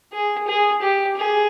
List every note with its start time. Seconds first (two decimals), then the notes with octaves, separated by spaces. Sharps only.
0.12 G#4
0.47 G#4
0.82 G4
1.16 G#4